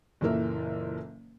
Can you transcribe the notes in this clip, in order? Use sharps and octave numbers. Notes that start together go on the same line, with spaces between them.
F#1 A#2 E3 A4 A#4 E5